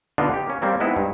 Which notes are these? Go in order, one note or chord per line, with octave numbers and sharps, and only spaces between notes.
B2 D3 B3 D4 D#4 F4
G4
A#3 C#4
G3 A#3 C4
G#3 B3 C4 D#4 E4
G2